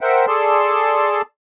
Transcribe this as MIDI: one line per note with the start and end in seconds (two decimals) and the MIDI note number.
0.01 0.26 70
0.01 0.26 72
0.01 0.26 76
0.01 0.26 78
0.01 0.26 79
0.28 1.22 68
0.28 1.22 69
0.28 1.22 74
0.28 1.22 81
0.28 1.22 84